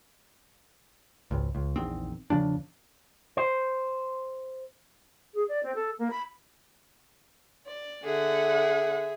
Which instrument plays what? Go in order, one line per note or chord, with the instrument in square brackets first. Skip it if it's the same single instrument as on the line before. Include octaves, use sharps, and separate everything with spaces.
[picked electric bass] G#1 C#2
C#2
A#1 E2 D#3 C4
E2 C#3 F3 D4
[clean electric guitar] C5
[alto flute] G#4
D5
C4
A4
A#3
B5
[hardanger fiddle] D5
[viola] D3 F#5 [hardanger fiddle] G#4 E5